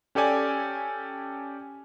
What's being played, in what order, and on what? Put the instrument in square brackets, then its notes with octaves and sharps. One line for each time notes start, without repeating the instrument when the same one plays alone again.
[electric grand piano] C#4 G4 A4 D5 G#5